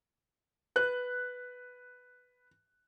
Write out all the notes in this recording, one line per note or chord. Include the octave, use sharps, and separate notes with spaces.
B4 F#6